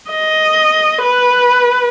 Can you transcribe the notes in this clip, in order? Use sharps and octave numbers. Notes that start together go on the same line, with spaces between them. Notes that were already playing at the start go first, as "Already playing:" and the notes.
D#5
B4